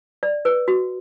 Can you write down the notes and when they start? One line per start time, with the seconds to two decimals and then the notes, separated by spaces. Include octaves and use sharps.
0.23 D5
0.45 B4
0.68 F#4